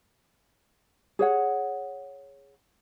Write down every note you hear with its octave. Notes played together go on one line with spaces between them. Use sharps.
G#4 C#5 F#5